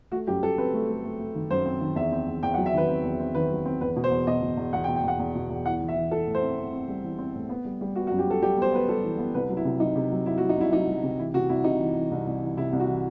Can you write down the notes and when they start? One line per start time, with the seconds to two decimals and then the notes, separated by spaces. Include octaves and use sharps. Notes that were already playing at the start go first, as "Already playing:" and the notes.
0.12 A3 F#4
0.27 F#2 G4
0.43 F#2 A4
0.58 C4 B4
0.73 A3
0.89 A3
1.04 A3
1.19 A3
1.35 D#3
1.50 F#2 C5
1.66 C4
1.81 D#3
1.96 E2 E5
2.12 C4
2.27 E2
2.43 E2 G5
2.54 F#5
2.57 F#3
2.66 E5
2.74 D#3 B4
2.88 C4
3.04 E2
3.19 C4
3.35 D#3 B4
3.50 F#3
3.66 C4
3.81 E2 B4
3.96 B2
4.04 C5
4.11 E2
4.27 B2 D#5
4.42 B2
4.57 E2
4.73 E2 F#5
4.84 G5
4.88 B2
4.96 G5
5.04 E2 F#5
5.19 E2
5.35 B2
5.50 E2
5.66 E3 F#5
5.81 E3
5.88 E5
5.96 E3
6.11 E3 A4
6.27 A2
6.35 C5
6.42 C4
6.57 C4
6.73 C4
6.88 G3
7.04 E3
7.19 C4
7.35 A2
7.49 B3
7.65 G3
7.81 G3
7.96 B3 F#4
8.07 F#4
8.12 F#2
8.19 G4
8.26 G3 A4
8.42 G3 G4
8.57 B3 C5
8.73 B3 B4
8.88 G3 A4
9.04 E3
9.18 B3
9.34 C2 B4
9.49 F#3
9.57 E4
9.65 C3
9.80 F#3 D#4
9.96 C3
10.11 F#3
10.26 F#3 E4
10.38 F#4
10.42 F#3
10.49 D#4
10.57 C2 E4
10.73 F#3 D#4
10.89 F#3
11.03 C3
11.19 E3 E4
11.34 C3 F#4
11.49 C2 E4
11.64 C3 D#4
11.80 E3
11.96 E3
12.11 C2
12.27 C2
12.42 E3
12.57 C3 E4
12.73 C2
12.80 F#4
12.87 E3